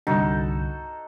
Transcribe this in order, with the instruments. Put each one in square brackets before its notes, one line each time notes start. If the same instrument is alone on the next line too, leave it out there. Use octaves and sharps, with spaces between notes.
[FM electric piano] C2 G2 D3 [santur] D#4 F#4 A4